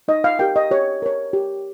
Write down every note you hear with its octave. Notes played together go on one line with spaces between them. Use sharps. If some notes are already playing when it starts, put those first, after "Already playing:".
D#4 D#5
F5
G4 A#4 G5
D#5
G4 C#5
A#4 C#5
G4